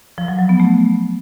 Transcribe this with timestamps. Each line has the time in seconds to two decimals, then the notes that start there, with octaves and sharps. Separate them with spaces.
0.18 F3
0.28 F#3
0.39 F#3
0.49 B3
0.60 A3